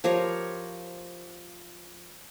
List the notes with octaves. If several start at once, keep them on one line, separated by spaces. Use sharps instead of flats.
F3 G4 A#4 C#5